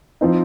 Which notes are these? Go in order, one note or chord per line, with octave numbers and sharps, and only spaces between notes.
F3 C4 D#4